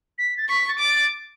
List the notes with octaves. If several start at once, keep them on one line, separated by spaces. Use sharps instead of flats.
B6
A6
C#6 B6
A6
D6
A6